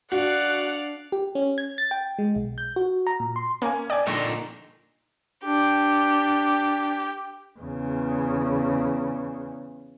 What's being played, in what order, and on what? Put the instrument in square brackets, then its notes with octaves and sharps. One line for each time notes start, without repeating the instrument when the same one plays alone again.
[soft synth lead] D4 [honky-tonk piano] F#4 [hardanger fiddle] D5 F5 [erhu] F#5
[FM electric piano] G4
C#4
G#6
A6
G5
G#3
B1
G6
F#4
A#5
A#2
C6
[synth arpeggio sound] A#3 [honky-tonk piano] C#4 G#5
[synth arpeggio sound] D5 [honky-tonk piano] G5 G#5
[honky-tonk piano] A#1 C#6 [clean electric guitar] A#2 D3 D#4
[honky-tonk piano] E7
[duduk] D4 [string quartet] G4
[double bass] E2 C#3